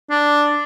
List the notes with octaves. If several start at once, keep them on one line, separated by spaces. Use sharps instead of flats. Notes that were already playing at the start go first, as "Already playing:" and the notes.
D4